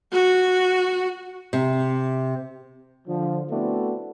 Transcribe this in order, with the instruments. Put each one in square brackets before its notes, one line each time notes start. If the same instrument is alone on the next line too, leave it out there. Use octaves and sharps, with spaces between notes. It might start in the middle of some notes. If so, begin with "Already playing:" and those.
[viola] F#4
[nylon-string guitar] C3
[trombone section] D3 F3
A3 B3 C4 D4 E4 F#4